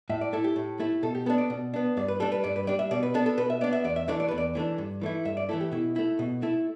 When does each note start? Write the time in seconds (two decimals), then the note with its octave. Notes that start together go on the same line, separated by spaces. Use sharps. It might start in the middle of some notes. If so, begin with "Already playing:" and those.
0.10 A2 E5
0.21 D5
0.33 A3 E4 A4
0.44 G4
0.56 A2
0.80 A3 E4
1.03 B2 A4
1.15 G4
1.26 B3 D4 A4
1.38 D5
1.50 B2
1.74 B3 D4
1.97 G2 D5
2.08 B4
2.20 G3 D4 A4
2.32 B4
2.44 G2 D5
2.56 B4
2.67 G3 D4 D5
2.79 E5
2.91 B2 D5
3.03 B4
3.14 B3 D4 A4
3.26 A4
3.38 B2 B4
3.50 E5
3.61 B3 D4 D5
3.73 E5
3.84 E2 D5
3.96 E5
4.08 E3 A3 D4 D5
4.20 D5
4.28 E2 B4
4.38 D5
4.55 E3 A3 D4
4.78 G2
5.02 E3 A3 E4
5.25 G2 E5
5.37 D5
5.49 E3 A3 E4 A4
5.61 G4
5.72 B2 E4
5.96 A3 E4
6.19 B2
6.42 A3 E4